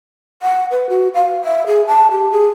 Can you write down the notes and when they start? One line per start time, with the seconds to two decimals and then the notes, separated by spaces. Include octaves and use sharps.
0.42 F#5
0.71 B4
0.89 F#4
1.14 F5
1.44 E5
1.67 G#4
1.87 A5
2.11 G4
2.32 G#4